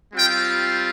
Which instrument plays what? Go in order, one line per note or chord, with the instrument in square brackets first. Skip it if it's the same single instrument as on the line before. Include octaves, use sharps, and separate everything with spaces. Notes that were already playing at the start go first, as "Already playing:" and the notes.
[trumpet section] G3 C4 F4 G5